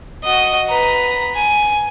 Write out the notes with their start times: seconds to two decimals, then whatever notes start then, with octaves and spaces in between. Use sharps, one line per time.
0.24 F#4 D#5
0.68 B4 A#5
1.35 G#5